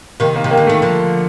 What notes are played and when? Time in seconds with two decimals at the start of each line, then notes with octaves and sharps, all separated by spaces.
0.20 C3 D#3 A#3
0.36 A#3
0.44 C3
0.51 A#3
0.57 D3
0.67 D#3 A3
0.82 D3 F3